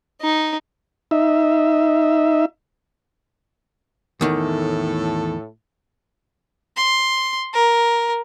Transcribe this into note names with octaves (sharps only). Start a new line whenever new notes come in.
D#4
D#4 E5
E2 A2 D#3 A4
C6
A#4